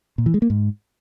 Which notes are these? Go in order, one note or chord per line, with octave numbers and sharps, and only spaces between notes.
A#2
E3
G#3
A#3
G#2